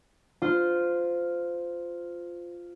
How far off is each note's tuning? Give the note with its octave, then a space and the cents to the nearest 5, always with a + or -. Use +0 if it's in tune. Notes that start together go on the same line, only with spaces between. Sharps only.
F4 +0 C5 -20